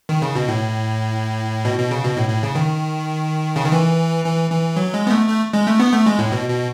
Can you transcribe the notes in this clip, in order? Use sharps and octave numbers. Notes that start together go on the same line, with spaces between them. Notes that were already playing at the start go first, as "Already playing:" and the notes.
D#3
C#3
B2
A2
B2
B2
C#3
B2
A2
A2
C#3
D#3
C#3
D#3
E3
E3
E3
F#3
G#3
B3
A3
A3
G#3
A3
B3
A3
G#3
A2
B2
B2